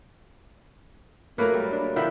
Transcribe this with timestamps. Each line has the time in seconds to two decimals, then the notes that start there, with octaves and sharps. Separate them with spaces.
1.38 F#3 A3 A#3 A#4 B4
1.54 G3
1.72 D4
1.96 D#3 F3 B3 E4